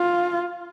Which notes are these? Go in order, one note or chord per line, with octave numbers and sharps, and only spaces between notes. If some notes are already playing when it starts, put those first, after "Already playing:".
Already playing: F4